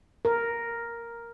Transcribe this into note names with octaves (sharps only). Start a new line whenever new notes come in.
A#4